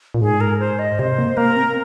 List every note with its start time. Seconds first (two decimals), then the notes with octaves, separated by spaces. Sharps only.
0.14 A#2
0.21 G#2 G#4
0.40 A#4
0.60 C5
0.79 D#5
0.99 C3 C5
1.19 A#3
1.37 A#3 A#4
1.56 C4